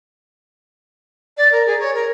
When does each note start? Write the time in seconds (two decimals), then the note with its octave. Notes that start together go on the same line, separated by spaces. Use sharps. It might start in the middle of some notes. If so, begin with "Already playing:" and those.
1.37 D5
1.51 A#4
1.66 G#4
1.79 C#5
1.93 A#4